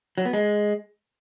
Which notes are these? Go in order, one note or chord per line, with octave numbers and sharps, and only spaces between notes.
F#3
B3
G#3